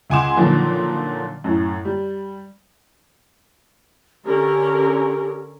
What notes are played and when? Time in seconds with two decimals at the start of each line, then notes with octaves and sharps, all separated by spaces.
0.10 C#2 F#5 G#5 C6 D6 E7
0.37 A#2 D3 D#3 F3 F#3 A#3
1.44 F#2 A2
1.85 G3
4.25 D3 C#4 G4 A#4